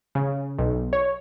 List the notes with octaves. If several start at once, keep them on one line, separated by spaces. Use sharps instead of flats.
C#3
B1
C#5